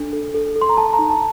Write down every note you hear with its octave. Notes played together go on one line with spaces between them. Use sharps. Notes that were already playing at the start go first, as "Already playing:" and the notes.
Already playing: D4 A4
A4
A4
A4
C6
A#5
A4 A5
A#5
D#4
A5